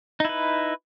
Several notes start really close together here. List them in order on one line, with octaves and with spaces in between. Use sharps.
D#4 E4 B4